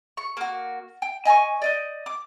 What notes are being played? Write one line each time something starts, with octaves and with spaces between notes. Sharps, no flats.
C#6
A#3 F#4
G5
D#5 G#5 A5 C#6
D5 D#5 G6
D6